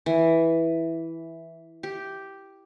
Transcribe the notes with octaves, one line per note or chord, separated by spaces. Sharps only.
E3
G4